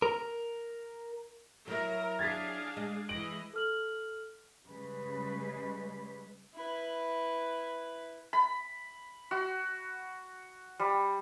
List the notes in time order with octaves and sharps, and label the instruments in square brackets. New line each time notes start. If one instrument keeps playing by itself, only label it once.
[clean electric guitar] A#4
[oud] F#3 E4 [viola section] A#4
[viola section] D4 G#4 F5 [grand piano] G#6 A6 B6
[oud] G#3
[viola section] E3 D#5 [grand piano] D7 F#7
[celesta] A4 F6 F#7
[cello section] C#3 G3 G#3 B4
[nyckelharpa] E4 B4
[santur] B5
F#4
G3